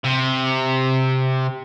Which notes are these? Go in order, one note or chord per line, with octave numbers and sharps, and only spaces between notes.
C3